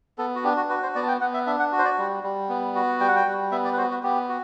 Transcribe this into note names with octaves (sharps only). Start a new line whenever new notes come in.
B3 A4
F#4
D4 G4
F#4
F#4 B4
C5
B3 D5
A5
G5
B3 F#5
E5
D4 E5
F#5
F#4
C5
D5
G3
G3
B3
F#4
G3 G5
F#5
G5
G3
B3 E5
D5
B4
F#4 C5
F#4
B3 G4
F#4